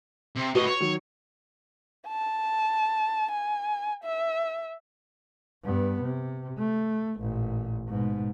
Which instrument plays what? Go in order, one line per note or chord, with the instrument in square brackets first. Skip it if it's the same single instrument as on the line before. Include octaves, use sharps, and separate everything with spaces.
[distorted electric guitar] C3
[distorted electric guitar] A2 D#5 [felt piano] F#4 B4 C#6
[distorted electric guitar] C#5
[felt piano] D#3 F#3
[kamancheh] A5
G#5
E5
[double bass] G2 B3
C3
A3
A1 A#2
G#2 B2